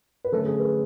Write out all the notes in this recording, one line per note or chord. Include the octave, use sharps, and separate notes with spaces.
B4
D3 F#3 A3 C#4 A4
G#4
B4